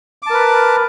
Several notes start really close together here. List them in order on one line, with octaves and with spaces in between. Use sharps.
D6 A5 A#4 B4